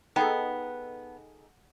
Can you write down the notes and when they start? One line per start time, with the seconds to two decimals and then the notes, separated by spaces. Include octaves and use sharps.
0.16 B3 D#4 G#4 A4 G5 A5 B5